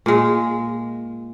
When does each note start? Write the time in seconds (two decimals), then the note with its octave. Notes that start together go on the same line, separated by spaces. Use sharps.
0.06 A#2 G#3